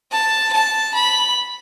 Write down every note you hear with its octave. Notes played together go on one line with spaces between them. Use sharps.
A5
A5
B5